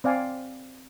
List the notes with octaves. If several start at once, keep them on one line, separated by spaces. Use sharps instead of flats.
C4 D5 F5 G#5